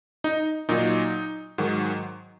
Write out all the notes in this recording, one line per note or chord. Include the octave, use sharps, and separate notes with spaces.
D#4
A#2 F#3 D#4
G#2 D#3 F#3